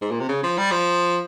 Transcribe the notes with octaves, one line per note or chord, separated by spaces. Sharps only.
G#2
A#2
C3
C#3
F3
G3
F3